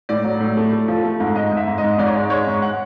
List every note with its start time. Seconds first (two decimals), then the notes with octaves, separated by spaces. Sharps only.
0.09 A2 D5
0.24 F#3
0.40 A2
0.57 A3
0.73 A3
0.88 F3
1.04 A3
1.20 G#2
1.36 G#2 D#5
1.51 G#2
1.57 E5
1.67 G#2
1.78 D#5
1.84 G#2
1.98 G#2 D5
2.06 C#5
2.15 G#3 D5
2.30 G#3 C#5
2.47 G#2
2.62 F#5